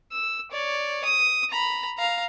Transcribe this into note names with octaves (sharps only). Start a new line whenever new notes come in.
E6
C#5 D5
D#6
A#5 B5
F5 A#5